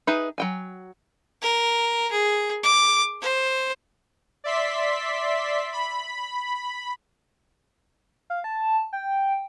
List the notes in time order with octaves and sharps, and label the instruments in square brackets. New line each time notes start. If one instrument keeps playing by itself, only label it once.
[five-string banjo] D#4 G#4 B4 E5
F#3 G5 G#5
[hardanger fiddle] A#4
G#4
D6
C5
[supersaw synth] D5 E5 C6 B6
B5
[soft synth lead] F5
A5
G5